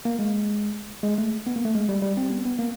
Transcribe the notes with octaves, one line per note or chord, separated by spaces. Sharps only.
A#3
G#3
G#3
A3
B3
A#3
A3
G#3
G3
G3
C4
B3
B3
A#3